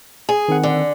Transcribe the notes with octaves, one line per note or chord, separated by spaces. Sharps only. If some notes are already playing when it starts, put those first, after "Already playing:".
G#4
D#3 C4 F#5
D3